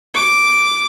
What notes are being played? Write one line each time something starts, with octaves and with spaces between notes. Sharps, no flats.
D6